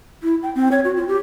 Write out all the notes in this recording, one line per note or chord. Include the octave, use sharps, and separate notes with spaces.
E4
G5
C4
C#5
F#4
F4
G4